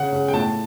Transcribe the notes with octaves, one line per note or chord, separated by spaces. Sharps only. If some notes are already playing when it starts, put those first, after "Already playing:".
Already playing: C#3 F#5
C#3
G5
A2 A5